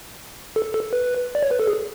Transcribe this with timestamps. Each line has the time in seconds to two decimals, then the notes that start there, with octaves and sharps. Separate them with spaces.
0.56 A4
0.74 A4
0.93 B4
1.35 D5
1.42 C#5
1.51 B4
1.60 A4
1.67 G#4